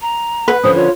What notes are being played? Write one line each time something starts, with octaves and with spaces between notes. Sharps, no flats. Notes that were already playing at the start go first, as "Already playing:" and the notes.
A#5
B4 F#5
D3 F3 C#4 C5 D#6
F4 C#5